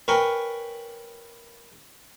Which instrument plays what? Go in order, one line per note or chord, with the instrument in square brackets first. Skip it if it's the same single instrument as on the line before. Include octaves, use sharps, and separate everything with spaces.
[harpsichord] A#4 B4 C#5 G5 G#5